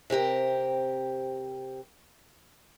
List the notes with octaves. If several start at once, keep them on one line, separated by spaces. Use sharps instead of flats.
C3 C4 G4 A#4